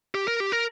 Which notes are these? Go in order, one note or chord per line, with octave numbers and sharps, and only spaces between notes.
G4
A#4
G4
A#4